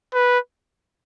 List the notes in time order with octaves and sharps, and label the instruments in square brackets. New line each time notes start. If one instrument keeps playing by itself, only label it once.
[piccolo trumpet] B4